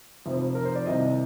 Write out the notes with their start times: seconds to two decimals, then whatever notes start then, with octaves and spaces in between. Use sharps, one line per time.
0.26 F1 F2 C3 F3
0.55 A#4
0.65 C5
0.75 D5
0.86 C2 C3 D#3 D#5